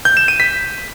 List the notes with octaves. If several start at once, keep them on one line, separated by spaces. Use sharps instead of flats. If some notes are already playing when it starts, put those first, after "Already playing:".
G6
E7
D#7
B6